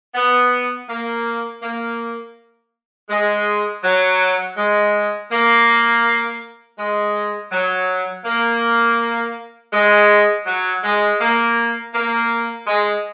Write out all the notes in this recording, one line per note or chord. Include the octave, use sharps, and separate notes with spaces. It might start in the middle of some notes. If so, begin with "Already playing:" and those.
B3
A#3
A#3
G#3
F#3
G#3
A#3
G#3
F#3
A#3
G#3
F#3
G#3
A#3
A#3
G#3